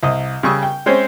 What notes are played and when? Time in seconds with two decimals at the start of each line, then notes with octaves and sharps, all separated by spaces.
0.03 C2 D#5 D#6
0.43 C#3 G3 C#6 D#6 E6
0.63 G5
0.86 G#3 C4 C#4 C5 C#5